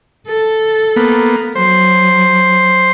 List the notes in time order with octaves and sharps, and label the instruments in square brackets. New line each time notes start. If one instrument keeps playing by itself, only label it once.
[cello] A4
[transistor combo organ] A#3 B3
[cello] F#3 [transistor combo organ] C5